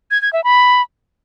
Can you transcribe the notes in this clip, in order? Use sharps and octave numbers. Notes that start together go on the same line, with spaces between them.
G#6
G#6
E5
B5